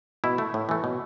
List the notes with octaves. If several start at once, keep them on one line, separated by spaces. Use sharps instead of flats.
B2 E4
A3
A2
E3 A3
B2